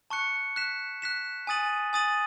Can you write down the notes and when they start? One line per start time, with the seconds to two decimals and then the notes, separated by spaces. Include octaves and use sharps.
0.10 A5 C#6 F#6 C#7
0.56 F#6 B6 E7
1.02 F#6 B6 E7
1.47 G#5 D#6 A6 D#7 F#7
1.93 G#5 D#6 A6 D#7 F#7